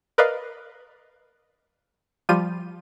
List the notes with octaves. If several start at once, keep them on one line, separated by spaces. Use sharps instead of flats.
A#4 B4 D5 D#5 F5
F3 G3 F4 G4 D#7